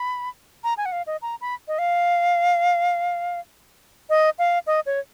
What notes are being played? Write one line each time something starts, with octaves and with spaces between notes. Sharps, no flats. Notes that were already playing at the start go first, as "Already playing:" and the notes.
Already playing: B5
A#5
G#5
F#5
F5
D#5
A#5
B5
D#5
F5
D#5
F5
D#5
C#5